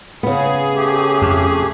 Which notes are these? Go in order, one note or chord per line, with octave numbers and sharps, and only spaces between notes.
C#3 B3 G#4
A3 G4
F2